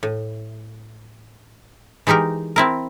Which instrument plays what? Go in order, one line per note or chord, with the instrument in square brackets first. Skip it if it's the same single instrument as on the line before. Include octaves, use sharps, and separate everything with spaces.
[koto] A2
E3 G#3 D#4 G4 A#4
C4 E4 A#4